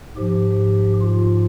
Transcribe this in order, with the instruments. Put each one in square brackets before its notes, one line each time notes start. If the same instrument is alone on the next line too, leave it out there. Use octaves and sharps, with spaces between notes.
[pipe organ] G#2 F3 G4
F4